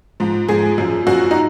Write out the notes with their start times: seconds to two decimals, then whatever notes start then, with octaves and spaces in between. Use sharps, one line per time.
0.20 G#2 F3
0.49 G#2 F3 G#4
0.78 F#2 F3
1.07 F#2 F3 F#4
1.31 D#4